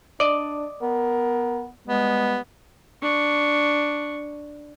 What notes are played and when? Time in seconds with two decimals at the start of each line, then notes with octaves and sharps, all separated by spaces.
0.20 D4 D5 D#5
0.82 B3 A#4
1.87 G3 G#3 B3
3.02 D4 C#6